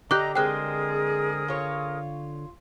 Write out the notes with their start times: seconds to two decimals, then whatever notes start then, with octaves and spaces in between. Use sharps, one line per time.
0.11 D3 G4 D#5 A#5 D6 F#6 G6
0.35 G#3 C4 G#4 A#4 G5 D#6 F#6
1.48 F4 C#5